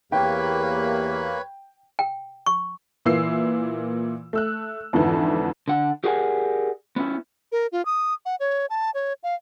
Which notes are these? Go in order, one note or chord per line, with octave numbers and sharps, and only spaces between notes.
E2 A#3 G4 B4 C#5 G5 B5
G5
C#6
A#2 E3 A#3 E6 C7
A3 E6 F#6
F2 G#2 D3 E3
D3 F#5
G4 G#4 A#4 D5 F#5 G#5
B3 C#4 E4
A#4
F4
D#6
F#5
C#5
A5
C#5
F5